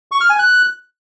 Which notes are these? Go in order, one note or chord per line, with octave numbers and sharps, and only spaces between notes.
C#6
F6
G#5
F#6